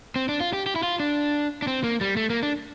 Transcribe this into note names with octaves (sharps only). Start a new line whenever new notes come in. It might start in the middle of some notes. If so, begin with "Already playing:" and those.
C4
D4
F4
G4
G4
E4
F4
D4
D4
C4
A#3
G3
A3
A#3
D4